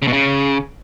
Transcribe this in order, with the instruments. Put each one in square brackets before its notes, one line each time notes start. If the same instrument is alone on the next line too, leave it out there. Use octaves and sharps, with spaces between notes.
[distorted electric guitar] C#3
B2
C#3